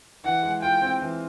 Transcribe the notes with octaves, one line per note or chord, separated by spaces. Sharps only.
E3 F#5
G#3
F4 G5
C4
E3